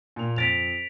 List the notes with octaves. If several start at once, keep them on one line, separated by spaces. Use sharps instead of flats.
A#2 F7
F2 A6 B6 D7 F7